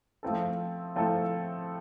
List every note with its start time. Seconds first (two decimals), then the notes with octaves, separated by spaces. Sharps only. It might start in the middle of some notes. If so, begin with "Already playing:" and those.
0.23 F3 A3 C4 E4 A4
0.95 F3 A3 C4 E4 A4